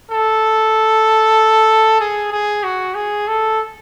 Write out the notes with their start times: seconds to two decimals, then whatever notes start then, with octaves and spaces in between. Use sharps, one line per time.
0.11 A4
2.00 G#4
2.32 G#4
2.64 F#4
2.95 G#4
3.28 A4